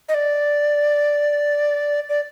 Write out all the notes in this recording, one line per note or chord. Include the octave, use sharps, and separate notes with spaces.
D#5
D5
D5